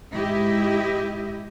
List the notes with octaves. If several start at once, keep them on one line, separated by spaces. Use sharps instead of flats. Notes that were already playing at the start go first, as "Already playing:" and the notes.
G#2 E4 G4 D#5 E5